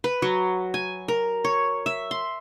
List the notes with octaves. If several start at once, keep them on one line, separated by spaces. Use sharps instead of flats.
B4
F#3
G#5
A#4
C#5
E5
C6